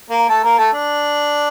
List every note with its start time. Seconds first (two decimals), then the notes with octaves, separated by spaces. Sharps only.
0.10 A#3 A#4
0.29 A3 A4
0.43 A#3 A#4
0.58 A3 A4
0.73 D4